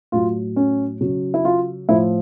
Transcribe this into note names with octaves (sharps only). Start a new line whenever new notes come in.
A2 F#3 F4
C#4
C#3 F#3
E4
F4
A2 F3 E4